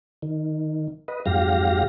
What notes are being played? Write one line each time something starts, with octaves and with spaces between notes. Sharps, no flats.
D#3
B4 D#5
F2 G#2 F#3 G4 F5 A#6